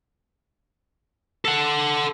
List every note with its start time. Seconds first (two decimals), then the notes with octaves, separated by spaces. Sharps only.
1.45 A4 F#5